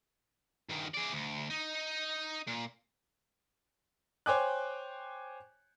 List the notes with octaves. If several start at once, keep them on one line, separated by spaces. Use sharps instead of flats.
G2 D#3
G#4 D5
D2
D#4
A#2
C5 C#5 G5 G#5 D6 F#6